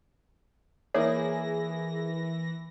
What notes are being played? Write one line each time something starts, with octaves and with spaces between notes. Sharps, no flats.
E3 A#3 E4 G#4 C#5 D5 A#6